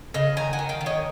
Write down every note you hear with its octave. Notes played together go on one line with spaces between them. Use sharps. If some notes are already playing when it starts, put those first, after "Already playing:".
C#3 D#5 F5
D#3 G#5 A#5
F#5 G#5
D#3
F5 G5
D#3
C#5 D#5